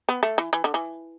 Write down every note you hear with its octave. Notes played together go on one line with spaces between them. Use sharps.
B3
A3
E3
E3
D3
E3